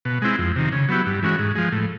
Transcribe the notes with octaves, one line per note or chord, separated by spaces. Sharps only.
B2
G#3 C4 E4
F2
C3 D#3
C#3
F#3 B3 E4 G4
G2
E3 G#3 C#4 F#4
G#2
F3 G#3
A2